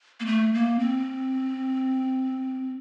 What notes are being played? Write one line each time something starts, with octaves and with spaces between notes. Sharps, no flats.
A#3
A3
A#3
C4